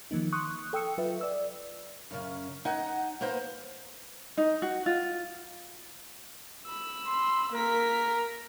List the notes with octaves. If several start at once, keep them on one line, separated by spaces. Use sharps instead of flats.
D#3 F3 A#3 D#4
C6 C#6 D#6 F#6
A4 G5 D#6 E6 C#7
F#3 F4 B4 E5
D5 E6
F#2 C#3
D#4 F#5 G#5
A#3 B3 B4 C5
D#4
F#4
F4
B5 E6
C6
A#3 A#4 B6